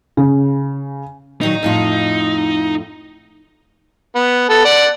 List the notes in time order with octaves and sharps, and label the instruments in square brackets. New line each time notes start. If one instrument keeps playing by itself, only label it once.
[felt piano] C#3
[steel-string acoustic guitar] A#2 D#3 F#3 [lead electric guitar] D#4
[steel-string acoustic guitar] F2 A2 F4
[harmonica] B3
B3 A4
D5 F#5